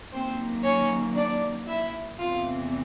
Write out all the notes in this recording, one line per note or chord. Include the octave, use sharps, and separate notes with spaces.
F#2 D#3 F#3 A#3 C4 C5
C#4 C#5
D4 D5
E4 E5
E2 C3 E3 A3 C4 F4 F5